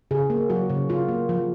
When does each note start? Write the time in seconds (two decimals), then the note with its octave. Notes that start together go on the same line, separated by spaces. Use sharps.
0.11 C#3 G#4
0.30 A#3
0.50 F#3 F#4
0.70 C#3
0.89 C#3 F4
1.08 A#3
1.29 F3